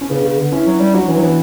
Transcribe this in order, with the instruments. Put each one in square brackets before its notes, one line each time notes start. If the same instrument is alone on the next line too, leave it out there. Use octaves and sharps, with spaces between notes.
[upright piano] C#4
[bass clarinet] C#3 [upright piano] B3 D4
[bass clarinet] C#3
D3
[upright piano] C#4 E4
[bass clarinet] F#3
G3
[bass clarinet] F#3 [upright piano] D4 F#4
[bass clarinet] E3 [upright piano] C#4 E4
[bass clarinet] F#3
[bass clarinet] E3 [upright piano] B3 D4